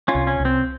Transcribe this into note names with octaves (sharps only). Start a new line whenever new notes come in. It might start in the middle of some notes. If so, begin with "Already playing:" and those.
C#4 F4
C2
C#4
C2
C4